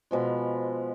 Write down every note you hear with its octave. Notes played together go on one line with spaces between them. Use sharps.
B2 F3 G#3